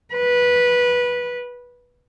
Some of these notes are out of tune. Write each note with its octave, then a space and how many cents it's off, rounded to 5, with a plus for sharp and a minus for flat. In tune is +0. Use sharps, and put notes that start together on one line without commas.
B4 -15